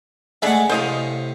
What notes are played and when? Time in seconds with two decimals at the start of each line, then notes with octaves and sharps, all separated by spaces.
0.42 G#3 A3 D4 G#4 E5 F#5
0.69 A2 C3 C5 D#5 F5